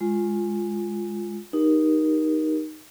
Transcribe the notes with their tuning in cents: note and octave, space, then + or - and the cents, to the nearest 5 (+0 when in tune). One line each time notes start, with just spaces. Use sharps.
G#3 +0 F4 +0
D#4 -5 G4 +0 A#4 +20